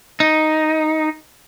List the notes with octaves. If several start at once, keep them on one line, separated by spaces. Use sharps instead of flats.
D#4